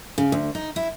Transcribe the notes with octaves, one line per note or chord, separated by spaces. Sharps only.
C#3
D2
D#4
E4